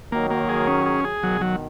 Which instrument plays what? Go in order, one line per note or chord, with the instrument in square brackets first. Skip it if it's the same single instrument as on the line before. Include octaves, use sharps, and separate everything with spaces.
[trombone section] D#3 F#3 [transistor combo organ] A#3
[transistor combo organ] A#3
G#4
C#4
G#4
G#4
[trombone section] B2 D#3 [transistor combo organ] F#3
[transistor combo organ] F#3